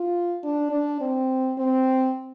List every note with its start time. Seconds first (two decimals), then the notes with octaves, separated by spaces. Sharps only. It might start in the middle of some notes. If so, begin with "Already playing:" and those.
Already playing: F4
0.43 D4
0.71 D4
1.01 C4
1.58 C4